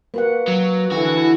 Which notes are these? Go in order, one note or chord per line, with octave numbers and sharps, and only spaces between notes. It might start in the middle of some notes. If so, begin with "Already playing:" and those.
A#3 F#4 B4 F#5
F#3
D3 E3 E4 F#4 A4